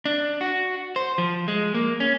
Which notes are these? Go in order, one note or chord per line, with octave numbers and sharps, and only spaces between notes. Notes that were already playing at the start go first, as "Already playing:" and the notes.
D4
F#4
C5
F3
G#3
A#3
C#4